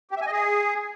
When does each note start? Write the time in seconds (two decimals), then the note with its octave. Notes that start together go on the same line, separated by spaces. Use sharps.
0.11 G4
0.16 E5
0.21 G#5
0.27 D#5
0.32 G#4